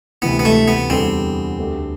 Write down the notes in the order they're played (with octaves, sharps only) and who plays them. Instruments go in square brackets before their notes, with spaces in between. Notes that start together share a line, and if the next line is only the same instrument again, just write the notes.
[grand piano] D2 C3 E3 [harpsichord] B3
[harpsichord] B3
A3
B3
[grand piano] E2 D3 G3 D4 A4 [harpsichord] C4
[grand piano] D2 D3 A3 D4 G4